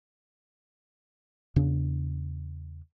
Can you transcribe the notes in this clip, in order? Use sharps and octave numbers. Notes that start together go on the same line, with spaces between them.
E2 C#3 D4